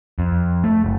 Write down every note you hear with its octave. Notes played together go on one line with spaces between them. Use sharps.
F2
A3
F#1